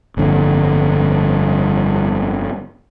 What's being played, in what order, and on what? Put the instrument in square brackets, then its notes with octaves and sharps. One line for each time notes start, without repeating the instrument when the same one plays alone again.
[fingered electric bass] G1 F2 D3